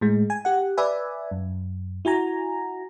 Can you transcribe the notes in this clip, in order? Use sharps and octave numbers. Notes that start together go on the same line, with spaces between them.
A2 G#3
G#5
G4 F#5
B4 D5 E5 G#5
F#2
E4 F#4 G#5 A#5